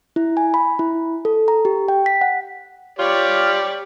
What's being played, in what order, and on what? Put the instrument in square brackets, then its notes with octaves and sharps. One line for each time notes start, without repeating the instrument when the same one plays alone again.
[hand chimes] E4
G#5
B5
E4
A4
A#5
G4
G5
B6
F#5
[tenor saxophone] F4 [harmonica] G4 D5 [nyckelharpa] C#5 D6